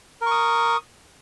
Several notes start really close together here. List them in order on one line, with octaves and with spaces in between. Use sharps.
A#4 C#6 D#6